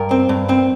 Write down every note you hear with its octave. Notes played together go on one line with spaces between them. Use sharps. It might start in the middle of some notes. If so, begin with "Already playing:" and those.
Already playing: G2 A#4
C4
G2
C4